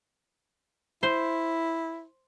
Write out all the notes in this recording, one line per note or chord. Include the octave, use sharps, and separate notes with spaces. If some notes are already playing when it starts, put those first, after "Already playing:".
E4 C5